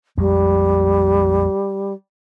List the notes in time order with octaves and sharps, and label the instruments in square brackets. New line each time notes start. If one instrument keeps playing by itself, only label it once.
[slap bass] A#1 F2 G#3 [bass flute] G3